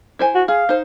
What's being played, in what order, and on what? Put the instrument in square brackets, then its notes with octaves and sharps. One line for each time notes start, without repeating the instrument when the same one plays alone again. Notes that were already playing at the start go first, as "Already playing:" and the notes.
[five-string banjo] E4 C5 G#5
[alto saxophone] F#4
[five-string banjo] G#4 [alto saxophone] F5
[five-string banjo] D#4 C5